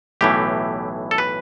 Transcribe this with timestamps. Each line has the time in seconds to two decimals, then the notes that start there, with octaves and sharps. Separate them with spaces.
0.21 B1 A2 E3 G4
1.11 A4
1.18 B4